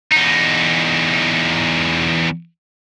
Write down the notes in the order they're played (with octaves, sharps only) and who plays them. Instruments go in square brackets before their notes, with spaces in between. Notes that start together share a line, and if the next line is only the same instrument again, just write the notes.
[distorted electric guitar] E2 D#4